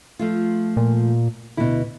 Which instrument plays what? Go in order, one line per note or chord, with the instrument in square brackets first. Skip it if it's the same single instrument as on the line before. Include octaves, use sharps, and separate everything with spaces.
[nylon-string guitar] F3 A3 F4
[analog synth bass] A#2
[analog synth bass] D2 [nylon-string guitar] B2 E4